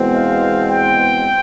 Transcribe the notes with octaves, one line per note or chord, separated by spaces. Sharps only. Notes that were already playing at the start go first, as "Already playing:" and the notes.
Already playing: E2 B2 G#3 C4
F5
G5